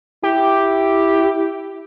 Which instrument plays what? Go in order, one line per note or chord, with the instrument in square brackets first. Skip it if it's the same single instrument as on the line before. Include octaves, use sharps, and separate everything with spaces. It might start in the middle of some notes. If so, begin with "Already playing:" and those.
[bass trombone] E4 [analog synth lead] G4